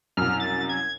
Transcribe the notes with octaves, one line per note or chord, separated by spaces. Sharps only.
C2 F#2 F6
A6
G#6